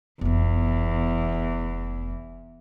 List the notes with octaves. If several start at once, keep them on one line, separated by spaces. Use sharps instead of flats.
F1 E2 B3